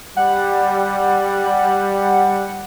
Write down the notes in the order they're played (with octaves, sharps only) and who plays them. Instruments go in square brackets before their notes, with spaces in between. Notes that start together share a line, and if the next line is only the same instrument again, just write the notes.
[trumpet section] G3 [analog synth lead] F#5